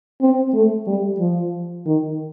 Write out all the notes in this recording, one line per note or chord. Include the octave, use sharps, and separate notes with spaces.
C4
A3
G3
F3
D#3